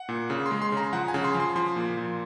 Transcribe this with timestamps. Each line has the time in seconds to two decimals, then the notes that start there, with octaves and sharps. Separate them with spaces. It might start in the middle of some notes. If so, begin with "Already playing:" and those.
Already playing: F#5
0.09 A#2
0.30 C#3
0.46 C6
0.51 G#3
0.62 C6
0.72 C#3 A#5
0.93 F3 F#5
1.08 G#5
1.14 C#3
1.24 C6
1.34 F3
1.40 C6
1.56 F3 C6
1.76 A#2
1.97 A#2